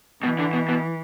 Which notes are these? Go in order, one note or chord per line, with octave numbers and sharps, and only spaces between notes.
B2 E3
D3
B2
B2